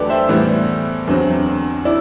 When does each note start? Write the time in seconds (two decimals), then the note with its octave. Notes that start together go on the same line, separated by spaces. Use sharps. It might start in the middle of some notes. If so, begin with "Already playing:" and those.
Already playing: E2 D3 F#3 A3 G4 A4 B4 D5
0.10 C5 E5
0.29 A2 E3 G3 B3
1.07 E2 D3 F#3 C4
1.85 E4 D5